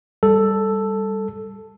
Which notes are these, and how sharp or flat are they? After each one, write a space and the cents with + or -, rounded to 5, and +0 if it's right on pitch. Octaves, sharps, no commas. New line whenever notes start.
G3 +10 A4 +0